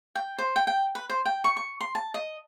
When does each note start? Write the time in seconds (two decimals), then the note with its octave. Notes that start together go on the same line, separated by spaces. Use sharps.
0.15 G5
0.38 C5
0.56 G5
0.67 G5
0.95 B4
1.10 C5
1.25 G5
1.44 C#6
1.57 C#6
1.80 C6
1.95 A5
2.14 D#5